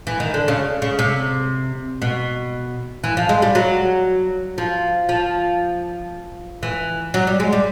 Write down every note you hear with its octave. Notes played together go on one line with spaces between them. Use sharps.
E3
D#3
D3
C#3
C#3
C3
B2
E3
F3
G#3
G3
F#3
F3
F3
E3
F#3
G3
G#3
G3